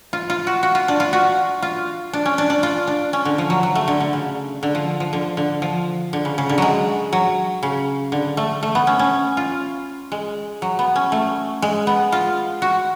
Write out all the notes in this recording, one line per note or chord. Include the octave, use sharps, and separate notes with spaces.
F4
F4
F#4
F#4
F4
D4
F4
F#4
F4
D4
C#4
D4
D4
F4
D4
C#4
D3
F3
F#3
F#3
A3
D3
D3
C#3
D3
F3
F3
D3
D3
F3
D3
C#3
C#3
D3
F#3 G#3
F#3
C#3
D3
A3
A3
B3
C#4
C#4
F4
G#3
F#3
B3
C#4
A3
G#3
B3
F4
F#4